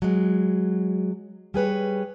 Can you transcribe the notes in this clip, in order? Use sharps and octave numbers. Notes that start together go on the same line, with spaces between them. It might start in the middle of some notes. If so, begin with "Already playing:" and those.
F#3 G#3
G3 G#4 B4 C#5